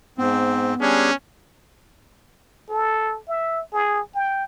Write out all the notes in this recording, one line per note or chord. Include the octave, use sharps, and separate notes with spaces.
G#2 B3 C4
G3 C#4 D4 G#4
A4
E5
G#4
G5